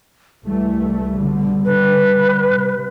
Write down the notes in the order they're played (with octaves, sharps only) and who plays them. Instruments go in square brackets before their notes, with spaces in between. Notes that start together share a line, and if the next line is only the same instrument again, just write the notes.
[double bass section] C2 E3 A3 [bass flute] G3
[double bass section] B2 D3
[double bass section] D3 [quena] B4
[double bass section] D3
C3